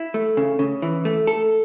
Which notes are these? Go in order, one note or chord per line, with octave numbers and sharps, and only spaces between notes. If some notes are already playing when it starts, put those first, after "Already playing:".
Already playing: E4
A3
C#3
C#3
E3
A3
A4